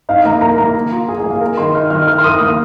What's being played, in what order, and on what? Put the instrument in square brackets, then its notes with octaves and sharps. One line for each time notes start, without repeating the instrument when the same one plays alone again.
[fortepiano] D#4 [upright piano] F5
[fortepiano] A#3 [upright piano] A#5
[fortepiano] A#4 [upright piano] A#5
[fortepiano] A#3 [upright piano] A#5
[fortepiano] A#3
F4
[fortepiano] G#4 [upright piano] G#5
[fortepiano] A#3 [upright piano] G#5
[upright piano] F5
[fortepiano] A#4 [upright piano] A#5
[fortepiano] D#3 [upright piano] C6
[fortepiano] D#4 [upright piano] F6
[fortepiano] D#3 [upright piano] F6
[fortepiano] A#4 [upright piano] F6
[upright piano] C6
[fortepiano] A#4 [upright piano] D#6
[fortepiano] A#3 [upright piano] D#6